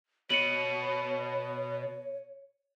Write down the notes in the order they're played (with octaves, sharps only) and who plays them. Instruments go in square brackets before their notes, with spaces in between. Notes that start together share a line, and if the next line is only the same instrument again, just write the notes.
[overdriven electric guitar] B2 [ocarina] C#5 [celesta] C#7 D#7 F#7